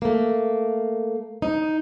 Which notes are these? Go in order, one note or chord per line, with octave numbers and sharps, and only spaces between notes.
A3 A#3
D#4